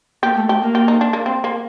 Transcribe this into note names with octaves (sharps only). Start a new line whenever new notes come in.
A#3 G4
A3
A3 G4
A#3
G4
D#4
D4
A#3
C4
A#3